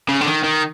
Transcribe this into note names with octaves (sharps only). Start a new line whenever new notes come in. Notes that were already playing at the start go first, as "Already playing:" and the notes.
C#3
D3
D#3
D#3